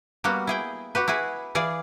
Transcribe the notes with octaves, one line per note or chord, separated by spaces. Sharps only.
G3 A#3 B3 F#4
E4 G#4 G5
F#4 G4 B4
E4 F#4 G#4 B4
E3 G#4 D5 F5